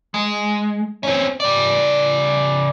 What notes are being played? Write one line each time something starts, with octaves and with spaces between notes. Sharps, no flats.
G#3
C4 C#4
C#3 D5